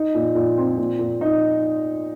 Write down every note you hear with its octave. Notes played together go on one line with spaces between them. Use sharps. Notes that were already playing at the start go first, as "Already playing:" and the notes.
Already playing: D#4
A#2
A#2
C4
A#2
A#2
D#4